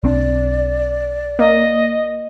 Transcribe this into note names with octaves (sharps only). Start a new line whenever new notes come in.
B1 C4 D4 D5
A#3 D#5